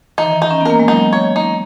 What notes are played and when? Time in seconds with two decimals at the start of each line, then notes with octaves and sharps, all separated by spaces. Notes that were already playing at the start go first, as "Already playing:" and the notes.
0.18 E3 D#4
0.25 D#3
0.32 E3
0.42 D#4
0.51 C#4
0.61 B3
0.65 A#3 A#4
0.79 G#3
0.88 F#3 D#4
1.13 C#5
1.36 D#4